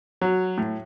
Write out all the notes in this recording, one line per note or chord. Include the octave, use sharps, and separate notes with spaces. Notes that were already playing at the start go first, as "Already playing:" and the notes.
F#3
A2